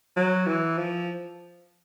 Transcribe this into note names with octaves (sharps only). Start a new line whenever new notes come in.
F#3
E3
F3